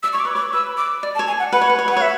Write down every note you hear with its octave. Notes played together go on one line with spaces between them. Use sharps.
D5 E6
C#5 C#6
D6
B4
C#5 D6
B4 E6
D6
D5
A5
C#5
G#5
F#5
B4 F#5
C#5
B4
C#5
B4
F#5
C#5
E5